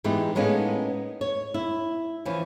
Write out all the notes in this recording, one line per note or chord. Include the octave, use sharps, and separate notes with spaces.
G#2 E3 G#3 B3 D#4 G4
A2 G#3 A#3 B3 C#4 D#4
C#5
E4
E3 F3 C#4